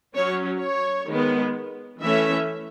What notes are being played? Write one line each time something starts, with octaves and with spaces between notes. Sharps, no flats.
F#3 C#4 C#5
C#5
D#3 G#3 B3
E3 A3 C#4 E5